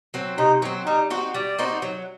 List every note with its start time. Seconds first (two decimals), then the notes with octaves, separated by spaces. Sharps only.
0.14 F#3 C4
0.38 C3 D#4
0.62 F#3 C4
0.86 G3 D#4
1.10 C4 D#4 F#4
1.34 G3 D5
1.59 C4 D#4 F#4
1.82 F#3